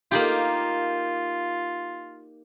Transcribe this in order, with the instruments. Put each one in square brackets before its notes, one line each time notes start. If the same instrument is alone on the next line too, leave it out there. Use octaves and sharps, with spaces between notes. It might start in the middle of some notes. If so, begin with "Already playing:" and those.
[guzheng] A#3 D#4 G4 [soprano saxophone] F4